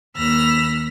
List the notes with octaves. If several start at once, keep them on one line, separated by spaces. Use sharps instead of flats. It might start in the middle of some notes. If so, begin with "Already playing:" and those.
D#2 B5 E6 F6 A#6